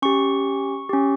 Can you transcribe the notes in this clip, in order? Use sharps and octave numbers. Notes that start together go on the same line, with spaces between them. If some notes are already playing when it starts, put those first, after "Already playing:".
C#4 G4 C#6
C#4 G4